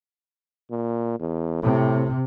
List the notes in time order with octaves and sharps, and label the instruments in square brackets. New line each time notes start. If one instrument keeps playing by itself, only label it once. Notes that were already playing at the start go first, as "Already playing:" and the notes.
[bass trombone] A#2
E2
[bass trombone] A2 [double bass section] C3